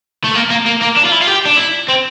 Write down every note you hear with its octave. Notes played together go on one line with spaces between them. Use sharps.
A3
A#3
A#3
A#3
A#3
D4
F4
E4
F4
G4
D4
E4
C4